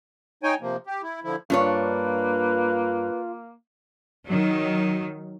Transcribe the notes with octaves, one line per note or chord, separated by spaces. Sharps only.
D#4 C#5 G5 G#5
C3 F3 A#3
G4
E4
D3 F3 E4
G2 A#3 D4 F4 B4 C#5
D#3 F#3